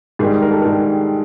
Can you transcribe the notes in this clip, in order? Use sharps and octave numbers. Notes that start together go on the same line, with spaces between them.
G#2 D#3 G3 G#4
A#4
A4
G#2 D#3 G3 A#4